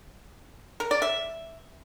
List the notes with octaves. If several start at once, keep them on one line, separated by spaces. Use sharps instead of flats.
A#4
D5
E5